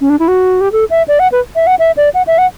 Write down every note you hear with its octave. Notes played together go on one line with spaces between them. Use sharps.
C#4
D4
E4
F#4
G4
A4
E5
D5
F#5
B4
E5
F#5
E5
D5
F#5
E5
F#5